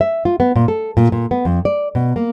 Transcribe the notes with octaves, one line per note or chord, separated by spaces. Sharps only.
E5
F4
B3
A#2
A4
A#2
A#2
B3
F2
D5
B2
A#3